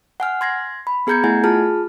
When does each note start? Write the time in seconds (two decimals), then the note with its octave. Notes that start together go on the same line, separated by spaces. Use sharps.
0.20 F#5 G#5 F6
0.41 C6 G#6 A#6 C7
0.87 B5
1.07 B3 G#4 A#5 G6 G#6 C#7
1.24 A3 E4 G#4 F#5 G#5 G#6
1.44 F4 G#4 A5 F6